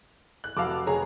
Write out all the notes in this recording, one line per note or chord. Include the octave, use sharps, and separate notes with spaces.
F#6
F1 F#4 F5 A5 D6 E6
F1 G#4 C#5 A#5